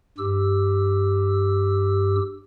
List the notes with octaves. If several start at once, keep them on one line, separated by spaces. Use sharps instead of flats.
G2 G4 E6